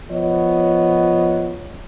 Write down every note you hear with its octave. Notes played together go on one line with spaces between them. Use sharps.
F3 B3 C#5 D#5